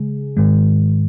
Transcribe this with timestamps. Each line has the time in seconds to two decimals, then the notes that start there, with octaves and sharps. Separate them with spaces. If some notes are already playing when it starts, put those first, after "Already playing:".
Already playing: C#3 G#3 G#4
0.37 G#2 D#3 G#3